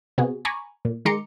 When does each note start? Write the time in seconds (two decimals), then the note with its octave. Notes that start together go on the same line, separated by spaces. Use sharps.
0.18 C3 B3 F#4 G#4
0.45 G#5 A#5 B5 C#6 D6
0.85 A#2
1.05 D#3 G#3 A#5 C6 D6 C#7